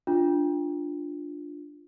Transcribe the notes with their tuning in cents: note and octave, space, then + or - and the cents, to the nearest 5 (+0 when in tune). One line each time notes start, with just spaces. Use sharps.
D4 +0 F4 +0